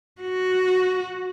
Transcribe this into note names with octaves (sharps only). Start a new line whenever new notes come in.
F#4